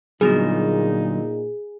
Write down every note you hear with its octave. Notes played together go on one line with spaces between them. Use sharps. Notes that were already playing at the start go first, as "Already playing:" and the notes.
A#2 D3 F#3 G3 B3 D#4 F#4 G#4